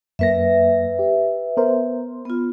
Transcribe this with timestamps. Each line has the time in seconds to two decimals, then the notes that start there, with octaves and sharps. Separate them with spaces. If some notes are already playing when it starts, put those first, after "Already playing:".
0.19 F#2 A#3 B4 E5 A#6
0.99 G4
1.57 B3 A#4 C5
2.25 B3 F4